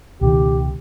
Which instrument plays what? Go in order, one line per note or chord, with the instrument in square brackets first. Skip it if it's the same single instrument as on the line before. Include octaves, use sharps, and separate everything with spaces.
[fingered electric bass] C#2 B2 D#3 [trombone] G4